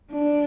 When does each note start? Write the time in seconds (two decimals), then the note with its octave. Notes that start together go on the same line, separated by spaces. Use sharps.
0.12 D4